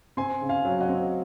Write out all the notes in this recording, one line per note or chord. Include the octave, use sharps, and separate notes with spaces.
C4 G#5 C6
C#3
F5 G#5
F#3
D#5 F#5
C4